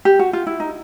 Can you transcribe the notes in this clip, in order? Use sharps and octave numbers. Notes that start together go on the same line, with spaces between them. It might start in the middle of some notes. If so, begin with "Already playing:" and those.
G4
F#4
F4
E4
D#4